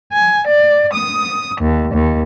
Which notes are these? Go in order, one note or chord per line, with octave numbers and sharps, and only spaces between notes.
G#5
D5
D#6
D#2
D#2